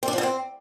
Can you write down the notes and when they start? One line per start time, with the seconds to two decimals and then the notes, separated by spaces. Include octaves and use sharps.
0.03 C4
0.08 D4
0.13 F3
0.18 D3
0.23 C4